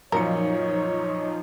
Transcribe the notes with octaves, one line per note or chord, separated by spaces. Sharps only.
F#2 A#2 F3 D#4 A#4 C#5 C#7